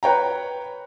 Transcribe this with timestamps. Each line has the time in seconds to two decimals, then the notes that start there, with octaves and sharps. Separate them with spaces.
0.03 B4 C#5 G5 A#5